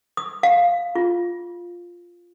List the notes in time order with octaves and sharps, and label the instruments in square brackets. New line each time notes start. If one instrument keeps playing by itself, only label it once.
[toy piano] D#6
F5
F4